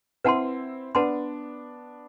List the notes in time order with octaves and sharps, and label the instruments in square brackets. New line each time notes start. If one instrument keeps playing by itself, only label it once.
[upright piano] C4 E4 [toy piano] B4 F#5 A5 C6
[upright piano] B3 D4 [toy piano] B4 F#5 A5 C6